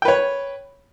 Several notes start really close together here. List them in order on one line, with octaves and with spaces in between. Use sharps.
G5 B4 C#5